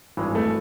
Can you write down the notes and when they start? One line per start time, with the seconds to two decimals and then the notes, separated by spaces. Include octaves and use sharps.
0.17 G#1 G2 E3 G#3
0.35 A3